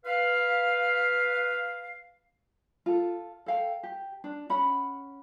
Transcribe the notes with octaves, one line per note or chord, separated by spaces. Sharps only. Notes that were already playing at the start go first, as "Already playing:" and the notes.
B4 F5
F4 A4
A4 F5 G5
G4
D4
C#4 F#5 B5